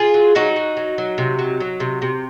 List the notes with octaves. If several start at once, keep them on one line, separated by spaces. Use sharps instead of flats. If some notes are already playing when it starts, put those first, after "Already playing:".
Already playing: F4 G#4
F#3
F#3 D#4 F#4
F#3
F#3
F#3
C3
F#3
F#3
C3
C3